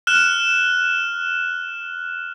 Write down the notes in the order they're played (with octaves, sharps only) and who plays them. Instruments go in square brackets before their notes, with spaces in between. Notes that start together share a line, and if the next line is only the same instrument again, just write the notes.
[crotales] F6 F#6 E7